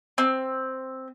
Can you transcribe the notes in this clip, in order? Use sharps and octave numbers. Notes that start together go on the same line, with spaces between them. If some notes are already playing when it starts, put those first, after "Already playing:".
C4